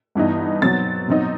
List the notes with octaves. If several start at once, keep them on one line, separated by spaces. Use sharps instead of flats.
G2 E3 B3 D#4
B2 F#3 C4 A6
B2 F#3 C4 D#4